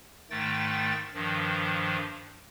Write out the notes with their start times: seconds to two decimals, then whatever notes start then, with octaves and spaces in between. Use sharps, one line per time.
0.30 G#2 D#3 A3 G5 A6
1.14 G2 D#3 F3